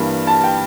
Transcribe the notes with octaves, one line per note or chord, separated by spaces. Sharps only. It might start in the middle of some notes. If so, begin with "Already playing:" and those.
Already playing: G2 E3 G3 A#3
A5
G5